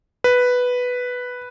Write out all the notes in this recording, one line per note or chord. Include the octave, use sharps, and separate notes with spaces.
B4